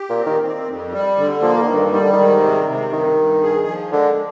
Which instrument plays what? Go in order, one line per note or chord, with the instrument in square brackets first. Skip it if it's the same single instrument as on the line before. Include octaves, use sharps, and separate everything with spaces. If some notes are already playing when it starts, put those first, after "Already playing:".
Already playing: [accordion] G4
[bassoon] A#2
[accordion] C4
[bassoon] D#3
[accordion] C4
F2
G3
D3
[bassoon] F3 [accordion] A#3
[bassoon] D3
[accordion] G2 [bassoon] D#3
[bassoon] D#3 [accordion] G3
[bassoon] D3
D#3
[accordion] G#2
C3
C3
[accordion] G2 [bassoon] D#3
[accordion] G2
G#4
F3
[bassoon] D3 [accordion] G#3